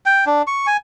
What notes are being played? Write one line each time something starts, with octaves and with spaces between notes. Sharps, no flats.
G5
D4
C#6
G#5